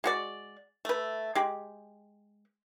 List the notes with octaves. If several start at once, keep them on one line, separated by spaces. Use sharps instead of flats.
G#3 F#4 D5
A3 B4
G#3 G4